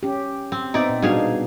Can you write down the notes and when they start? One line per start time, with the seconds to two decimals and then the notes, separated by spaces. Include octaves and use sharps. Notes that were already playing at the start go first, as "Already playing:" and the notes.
0.03 C#4 G4
0.52 C4
0.74 B3 C4 D#4 D5 E5
0.89 A#2
1.02 B2 G3 D4 D#4 G#4 F5